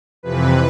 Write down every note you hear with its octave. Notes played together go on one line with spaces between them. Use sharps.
F2 C3 E3 B4